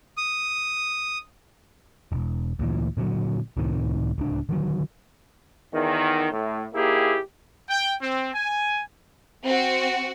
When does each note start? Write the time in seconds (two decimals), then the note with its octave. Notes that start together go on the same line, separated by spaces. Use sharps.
0.17 D#6
2.12 E1
2.59 D2 A#2 E3
2.97 A#2 D3 F3 F#3
3.57 C#2 A2 C3 D#3
4.18 D1 C#2 D4
4.49 D3 D#3 F#3
5.74 E2 D#3
6.32 A2
6.74 D#2 A#3 E4 G4 G#4
7.69 G5
8.01 C4
8.34 G#5
9.44 C4 F#4